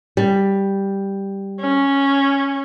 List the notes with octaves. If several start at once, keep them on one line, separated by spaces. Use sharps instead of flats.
G3
C#4